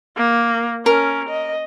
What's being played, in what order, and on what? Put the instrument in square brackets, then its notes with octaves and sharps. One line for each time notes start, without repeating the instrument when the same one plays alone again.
[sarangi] A#3
[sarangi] C#4 [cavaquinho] A#4
[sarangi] D#5